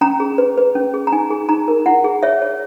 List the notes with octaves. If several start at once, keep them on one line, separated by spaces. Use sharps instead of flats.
C#4 A#5
G#4
B4
B4
C#4
G#4
A#5
D#4 G#5
G#4
D#4 A#5
A#4
E4 F#5
G#4
C#5 E5
C#5